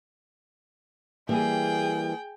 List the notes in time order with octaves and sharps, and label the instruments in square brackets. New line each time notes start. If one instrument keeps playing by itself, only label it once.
[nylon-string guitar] E3 G3 A#3 [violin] G#4 G5